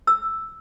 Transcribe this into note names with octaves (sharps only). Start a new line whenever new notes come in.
E6